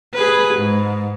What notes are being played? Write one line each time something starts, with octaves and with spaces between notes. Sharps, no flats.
G#4 B4
G#2